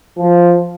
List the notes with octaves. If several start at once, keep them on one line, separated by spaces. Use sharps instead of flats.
F3